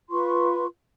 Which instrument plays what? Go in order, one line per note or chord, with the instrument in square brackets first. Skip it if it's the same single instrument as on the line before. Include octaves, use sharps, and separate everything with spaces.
[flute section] F4 B4 C6 C#6